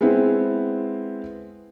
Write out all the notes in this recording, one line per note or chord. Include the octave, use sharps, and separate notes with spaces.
G#3 B3 C4 E4